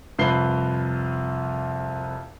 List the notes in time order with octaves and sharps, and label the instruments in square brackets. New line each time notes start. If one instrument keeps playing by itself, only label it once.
[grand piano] C2 F2 B4 C7 G7